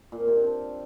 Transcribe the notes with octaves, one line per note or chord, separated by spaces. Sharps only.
A#2
C4
C3
D4
C4